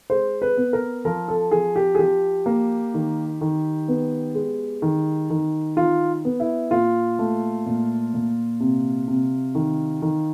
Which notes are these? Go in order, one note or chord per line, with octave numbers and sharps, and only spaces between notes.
G#3 C5
B4
B3
A#4
F3 A#4
A4
F3 G#4
G4
G#4
F3 G4
A#3
D#3
D#3
B3
G#3
D#3
D#3
D#3 F4
B3
E4
A#2 F4
A3
A#2
A#2
C3
C3
D#3
D#3